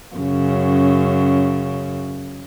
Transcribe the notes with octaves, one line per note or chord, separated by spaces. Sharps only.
F#2 C#3